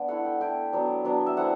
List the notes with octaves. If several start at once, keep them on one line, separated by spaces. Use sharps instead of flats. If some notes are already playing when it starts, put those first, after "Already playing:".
Already playing: B3 D4
A3 E4 F#5
G5
A3 E4 G5
F#3 B3 D4
F#3 B3 D4
E5
A3 C4 E4 F#5